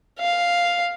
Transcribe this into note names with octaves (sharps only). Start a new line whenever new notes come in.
F5